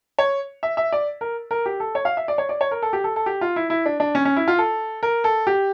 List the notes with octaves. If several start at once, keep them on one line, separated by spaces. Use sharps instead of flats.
C#5
E5
E5
D5
A#4
A#4
G4
A4
C#5
F5
E5
D5
C#5
D5
C#5
A#4
A4
G4
A4
A4
G4
F4
E4
E4
D4
D4
C#4
C#4
E4
F4
A4
A#4
A4
G4